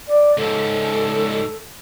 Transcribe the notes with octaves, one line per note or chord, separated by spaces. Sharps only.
D5
C#2 G#2 A4